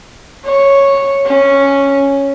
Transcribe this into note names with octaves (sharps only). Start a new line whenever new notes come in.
C#5
C#4